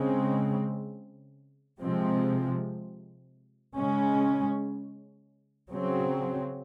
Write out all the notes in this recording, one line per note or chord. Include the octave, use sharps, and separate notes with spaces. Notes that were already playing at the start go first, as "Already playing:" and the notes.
Already playing: C#3 G#3 C4
C3 F3 G#3 C4
C#3 G#3 C#4
C#3 F#3 C4